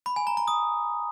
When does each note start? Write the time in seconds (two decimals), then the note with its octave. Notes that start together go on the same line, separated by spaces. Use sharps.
0.06 B5
0.16 G#5
0.27 A#5
0.37 A#5
0.48 D#6